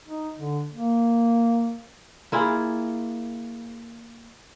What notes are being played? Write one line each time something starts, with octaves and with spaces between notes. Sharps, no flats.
D#4
D3
A#3
A#3 E4 F4 G#4